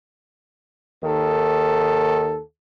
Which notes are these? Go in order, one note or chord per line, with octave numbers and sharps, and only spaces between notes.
D#2 D#3 A4